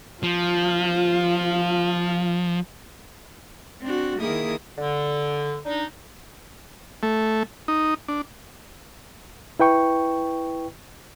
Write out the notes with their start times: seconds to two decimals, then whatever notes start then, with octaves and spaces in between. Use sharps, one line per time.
0.23 F3 F4 F5
3.81 C4 D4 F#4
4.19 D#3 A#3 E4 G#4 A#4 D#6
4.78 D3
5.66 D4 D#4
7.03 A3
7.68 D#4
8.08 D4
9.60 E4 B4 G5 C#6